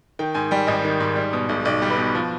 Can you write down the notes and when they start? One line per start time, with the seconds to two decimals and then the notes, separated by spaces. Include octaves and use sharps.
0.19 D#3 G5
0.34 G#2 G#5
0.51 G3 G5
0.67 G#1 D#5
0.84 D#3
1.00 G#2
1.16 G3
1.33 B2
1.49 B1
1.65 B1 D5
1.82 G3
1.90 B4
1.98 B2
2.15 F3